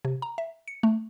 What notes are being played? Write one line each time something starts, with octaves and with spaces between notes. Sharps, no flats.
C3
A#5
E5
C#7
A3